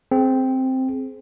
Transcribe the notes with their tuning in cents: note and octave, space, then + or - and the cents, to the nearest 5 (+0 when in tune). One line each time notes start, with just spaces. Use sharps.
C4 +0 G#4 +25